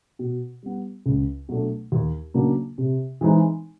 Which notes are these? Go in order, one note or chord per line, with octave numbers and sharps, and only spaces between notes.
B2
G3 B3
C#2
B2 F#3 A3 D4
D#2
C#3 F#3 A#3 D4
C3
E3 G#3 C4 D#4